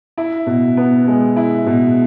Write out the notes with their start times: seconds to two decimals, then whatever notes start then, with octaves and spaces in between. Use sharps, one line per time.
0.17 E4
0.47 B2
0.77 B3
1.08 G#3
1.36 E4
1.66 B2